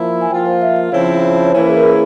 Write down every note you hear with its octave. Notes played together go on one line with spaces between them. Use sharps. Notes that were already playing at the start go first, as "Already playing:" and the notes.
Already playing: F3 A#3 E4
G#5
F3 A#3 F4 G5
C5
E5
F5
C#3 F3 C4 E4 C#5
C#5
E3 A#3 C#4 E4 C5
G#4
A#4
G#4